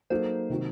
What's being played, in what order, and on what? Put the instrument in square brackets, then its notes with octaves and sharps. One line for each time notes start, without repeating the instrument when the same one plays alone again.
[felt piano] F#3 A#3 D#4 A4 [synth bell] C5
[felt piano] C3 D#3 F#3